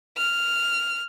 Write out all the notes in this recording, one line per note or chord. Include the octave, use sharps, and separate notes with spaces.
F6